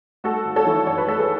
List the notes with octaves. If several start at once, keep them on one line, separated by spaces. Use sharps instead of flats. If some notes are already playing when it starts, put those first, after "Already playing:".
A3 F#4 A4
G#1
A4 C#5
E3
F#2 C#5
B4
A3 A4
G#4 B4